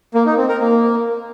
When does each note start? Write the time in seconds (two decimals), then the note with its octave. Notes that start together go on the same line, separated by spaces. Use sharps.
0.14 A#3
0.26 D#4
0.37 C4
0.49 A#4
0.60 A#3